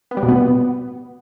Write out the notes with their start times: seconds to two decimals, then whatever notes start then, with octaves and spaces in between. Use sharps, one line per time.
0.11 B3
0.17 G3
0.23 B2
0.29 B3